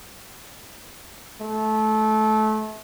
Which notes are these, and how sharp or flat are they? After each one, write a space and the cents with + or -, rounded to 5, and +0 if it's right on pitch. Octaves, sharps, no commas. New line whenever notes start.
A3 -20